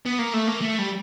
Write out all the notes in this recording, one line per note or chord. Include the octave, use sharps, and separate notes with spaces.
B3
A#3
A3
A#3
A3
G3